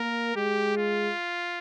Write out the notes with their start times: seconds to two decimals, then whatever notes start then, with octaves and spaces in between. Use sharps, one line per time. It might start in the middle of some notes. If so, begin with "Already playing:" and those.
Already playing: A#3 A#4
0.36 G#3 G4
0.77 F4